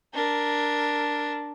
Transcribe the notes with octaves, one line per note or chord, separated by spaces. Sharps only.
D4 A#4